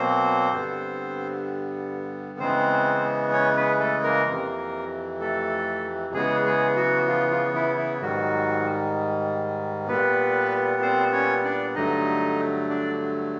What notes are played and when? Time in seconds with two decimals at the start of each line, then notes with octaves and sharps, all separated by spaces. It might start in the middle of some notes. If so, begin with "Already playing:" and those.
Already playing: B2 F#3 A#3 C4 C5
0.52 G2 D3 G3 B3
2.39 C#3 E3 G#3 B3 C4 C5
3.33 C#4 C#5
3.56 B3 B4
3.80 A3 A4
4.03 A#3 A#4
4.26 F2 C3 E3
5.21 A3 A4
6.14 C#3 E3 G#3 B3 G#4
6.45 G#3 G#4
6.76 F#3 F#4
7.07 F3 F4
7.30 F3 F4
7.54 E3 E4
7.77 E3 E4
8.01 G#2 D#3 F#3 G3 F#4
9.88 A#2 G3 B3 B4
10.82 C4 C5
11.13 C#4 C#5
11.44 D4 D5
11.75 G2 D3 F#3 A3 D#4 D#5
12.69 D4 D5